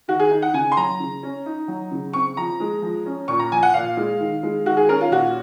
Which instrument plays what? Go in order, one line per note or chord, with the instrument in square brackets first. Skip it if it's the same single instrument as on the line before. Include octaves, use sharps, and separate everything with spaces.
[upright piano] D#3 F#4
G#4
D#4
F#5
C#3 G#5
C6
F#3 A#5
C#3
C#4
D#4
F#3
C#3
C4 C#6
F3 A#5
G#3
F3
C#4
A#2 C#6
A#5
F3 G#5
F#5
A#2 F5
G#3
D#3
G#3
D#3 F#4
G#4
C#4 A#4
F4
A#2 F#4